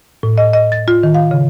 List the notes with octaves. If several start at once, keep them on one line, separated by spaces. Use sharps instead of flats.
A2
D#5
D#5
A6
F4
D#3
F5
C#3